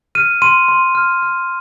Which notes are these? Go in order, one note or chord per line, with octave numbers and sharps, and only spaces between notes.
F6 D#7
C6 D#7
C6
F6
F6